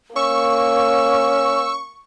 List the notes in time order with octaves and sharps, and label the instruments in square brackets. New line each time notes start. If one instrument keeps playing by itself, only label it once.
[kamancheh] A#3 [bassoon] C#4 [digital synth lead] C#6 [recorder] E6